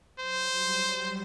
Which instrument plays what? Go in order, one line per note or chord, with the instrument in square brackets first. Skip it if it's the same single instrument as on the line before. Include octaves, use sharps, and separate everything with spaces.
[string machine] F#3 [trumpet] C5
[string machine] G3
G3